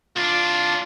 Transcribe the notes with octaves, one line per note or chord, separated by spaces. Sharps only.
C2 D4 F4